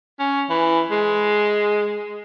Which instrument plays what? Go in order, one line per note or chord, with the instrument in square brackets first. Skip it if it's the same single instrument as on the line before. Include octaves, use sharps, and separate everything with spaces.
[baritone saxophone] C#4
E3
G#3